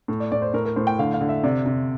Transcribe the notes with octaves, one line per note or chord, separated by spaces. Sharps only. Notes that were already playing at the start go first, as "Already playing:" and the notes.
A2
D5
A2 D5
C5
A2 A#4
A#4
A2 C5
G5
D3 F5
F5
D3
E5
C3 D5
C3